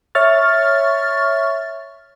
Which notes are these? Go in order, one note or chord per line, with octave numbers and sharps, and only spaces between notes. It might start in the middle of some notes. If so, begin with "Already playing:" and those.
C#5 E5 C#6 F6 A6